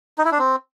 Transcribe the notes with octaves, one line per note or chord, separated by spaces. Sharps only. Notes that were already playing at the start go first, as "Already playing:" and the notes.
D#4
E4
D4
C4